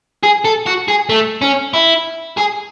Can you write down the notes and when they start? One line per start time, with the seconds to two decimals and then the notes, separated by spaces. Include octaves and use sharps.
0.23 G#4
0.45 A4
0.66 F#4
0.88 G#4
1.09 A3
1.41 C#4
1.74 E4
2.38 G#4